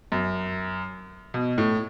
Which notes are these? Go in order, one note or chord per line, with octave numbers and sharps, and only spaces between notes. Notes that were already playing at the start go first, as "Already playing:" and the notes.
F#2
B2
A2